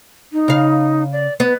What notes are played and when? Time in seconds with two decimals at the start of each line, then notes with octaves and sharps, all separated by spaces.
0.32 D#4
0.48 C#3 F5
1.12 D5
1.40 B3 B4